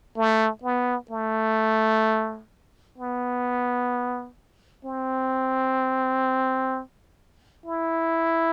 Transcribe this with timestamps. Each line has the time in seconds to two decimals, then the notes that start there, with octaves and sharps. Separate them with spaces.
0.17 A3
0.63 B3
1.11 A3
2.98 B3
4.85 C4
7.66 E4